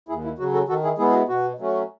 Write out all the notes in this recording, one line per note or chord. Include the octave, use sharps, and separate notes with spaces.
D#2 E4 G#4
E4
C#3 F#3 F#4
F#4 A4
D#3 F#4 A4
E4 G#4
G#3 B3 E4 G#4
G#4
F#4
B2 F#4
F#3 A3 C#4